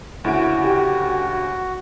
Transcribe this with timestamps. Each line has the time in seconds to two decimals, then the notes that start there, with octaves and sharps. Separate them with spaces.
0.24 D2 C#3 E4 F#4 D7
0.64 G4